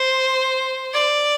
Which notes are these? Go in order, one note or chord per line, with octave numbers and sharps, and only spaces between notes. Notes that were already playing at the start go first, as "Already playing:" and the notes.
Already playing: C5
D5